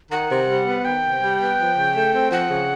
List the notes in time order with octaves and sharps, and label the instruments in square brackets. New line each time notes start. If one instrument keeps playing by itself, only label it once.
[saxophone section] D#3 [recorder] F#5
[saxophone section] C3
G3
B3
[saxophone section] D#3 [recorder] G5
[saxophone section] C3
G3
B3
F3
C#3
A3
C4
[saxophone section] F3 [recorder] F#5
[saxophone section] C#3